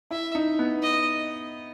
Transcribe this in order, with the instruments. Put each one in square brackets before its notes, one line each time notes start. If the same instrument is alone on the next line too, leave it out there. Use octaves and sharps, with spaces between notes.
[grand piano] E4 [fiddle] E5
[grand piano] D#4
B3
[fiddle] D#5